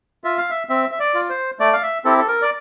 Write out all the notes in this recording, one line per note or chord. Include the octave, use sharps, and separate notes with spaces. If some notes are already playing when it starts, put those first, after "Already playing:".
F4 E5
F5
E5
C4 E5
E5
D5
F4
C5
A3 D5
F5
E5
C4 E4 G4 A4
A4
A#4
D5